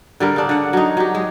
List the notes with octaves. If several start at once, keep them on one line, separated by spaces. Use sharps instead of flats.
D3 G3 A#4
C#3 D4
D3 F#5
F#3 D#4
F#3 G4
G#3